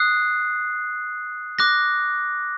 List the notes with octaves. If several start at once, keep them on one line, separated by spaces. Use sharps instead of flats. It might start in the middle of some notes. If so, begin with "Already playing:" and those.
Already playing: D#6 F#6 C7
D6 F#6 A#6